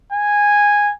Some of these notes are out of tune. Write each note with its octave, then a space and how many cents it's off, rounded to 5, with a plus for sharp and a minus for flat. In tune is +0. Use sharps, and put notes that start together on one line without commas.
G#5 -10